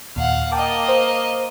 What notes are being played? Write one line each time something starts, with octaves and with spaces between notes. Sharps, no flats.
D#2 A#2 F5 F#5
A#3 D#5 G5 A5 D6
C5